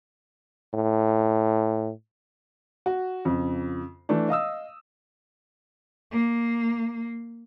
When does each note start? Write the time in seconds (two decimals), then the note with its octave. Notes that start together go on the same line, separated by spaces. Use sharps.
0.74 A2
2.86 F#4
3.25 F2 C#3
4.09 E3 A3 D4
4.29 D#5 F5 D#6 E6
6.11 A#3